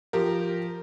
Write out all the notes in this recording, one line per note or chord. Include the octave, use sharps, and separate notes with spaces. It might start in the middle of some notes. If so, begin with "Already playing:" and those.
F3 G4 A#4